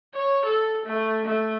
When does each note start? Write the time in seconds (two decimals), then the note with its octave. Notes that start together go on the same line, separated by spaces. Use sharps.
0.14 C#5
0.45 A4
0.86 A3
1.25 A3